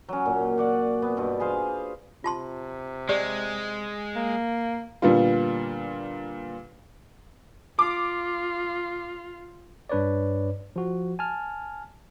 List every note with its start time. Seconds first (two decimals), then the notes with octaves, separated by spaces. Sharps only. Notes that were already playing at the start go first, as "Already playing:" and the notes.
0.09 F#3 C#4
0.26 A#2
0.58 F#4 D5 F#5
1.02 B3
1.17 G2 B2
1.40 G#4 B4 C5 F5
2.24 C3 F4 A5 C6
3.09 G#3 G4 C5 D5
4.16 A#3
5.02 A#2 D3 G3 B3 D4 F4
7.79 F4 D6
9.89 G2 D4 B4 C#5 D5
10.76 F3 F#4
11.19 G#5 A5 F6